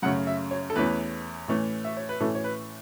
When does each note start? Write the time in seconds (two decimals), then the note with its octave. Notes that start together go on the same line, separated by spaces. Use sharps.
0.02 F#2 C#3 A3 C#4 F#5
0.27 E5
0.51 C#5
0.70 A4
0.76 E2 E3 A3 C#4 B4
1.48 A2 E3 A3 C#4
1.85 E5
1.97 C#5
2.09 B4
2.20 A2 E3 A3 C#4 A4
2.35 C#5
2.44 B4